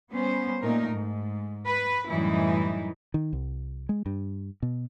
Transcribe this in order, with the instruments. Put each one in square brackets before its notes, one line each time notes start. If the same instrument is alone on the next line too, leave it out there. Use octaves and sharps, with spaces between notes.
[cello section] G3 B3 C#4 C5
A#2 A3 D#4 A#4
G#2
B4
F#2 A2 E3 G3 D#4 E4
[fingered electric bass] D#3
C2
G#3
G2
B2